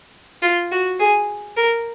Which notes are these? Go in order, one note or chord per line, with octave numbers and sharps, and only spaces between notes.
F4
F#4
G#4
A#4